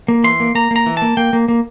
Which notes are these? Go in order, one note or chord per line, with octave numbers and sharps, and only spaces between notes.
A#3
E3 C6
A#3
A#3 A#5
A#3 A#5
E3
A#3 A5
A#3 G5
A#3
A#3